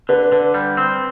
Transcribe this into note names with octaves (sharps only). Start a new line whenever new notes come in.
D3 B4
D3
G3
C4